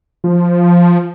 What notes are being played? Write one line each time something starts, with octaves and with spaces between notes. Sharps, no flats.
F3